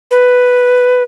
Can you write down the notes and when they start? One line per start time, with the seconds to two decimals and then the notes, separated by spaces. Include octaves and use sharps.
0.11 B4